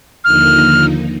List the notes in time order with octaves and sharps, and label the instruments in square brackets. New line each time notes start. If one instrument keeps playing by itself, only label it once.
[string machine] D#2 D3 F3 A#3 D#4 [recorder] F6